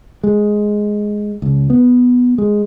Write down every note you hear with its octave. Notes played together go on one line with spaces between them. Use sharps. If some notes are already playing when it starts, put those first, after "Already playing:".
G#3
C#2
B3
G#3